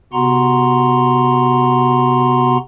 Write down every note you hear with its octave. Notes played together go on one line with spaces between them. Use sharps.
C3 B3 F#4 F#5 A#5 C6